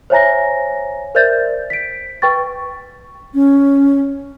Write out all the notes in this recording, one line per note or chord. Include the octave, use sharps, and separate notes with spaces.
C5 C#5 E5 G#5 A#5 A#6
A#4 C5 D5 E5 G6 A6
B6 D7
B4 G5 C#6 A6
C#4